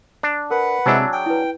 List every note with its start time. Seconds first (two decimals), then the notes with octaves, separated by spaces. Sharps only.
0.23 D4
0.51 A#4 B4 F#5
0.86 C3 F#3 G#3 D4 E4 G#5 A5 E6
1.13 G#4 G5
1.26 E4 B4